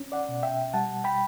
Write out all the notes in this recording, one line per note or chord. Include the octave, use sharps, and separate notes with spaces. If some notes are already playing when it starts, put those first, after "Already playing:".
Already playing: C#4
D5 F#5
B2
E5 G5
G3 F#5 A5
G5 B5